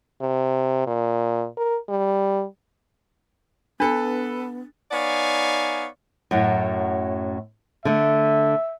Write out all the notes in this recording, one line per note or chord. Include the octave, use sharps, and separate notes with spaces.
C3
A#2
A#4
G3
B3 D4 A4 B4
B3 D#4 C#5 D5 F5 G#5
F#2 A2 F#3
D3 A3 E5